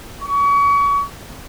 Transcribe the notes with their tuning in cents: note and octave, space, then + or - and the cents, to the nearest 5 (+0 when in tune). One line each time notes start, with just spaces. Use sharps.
C#6 +35